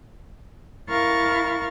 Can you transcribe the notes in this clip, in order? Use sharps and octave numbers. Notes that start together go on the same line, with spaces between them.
E4 A#4 F5 C#6 A6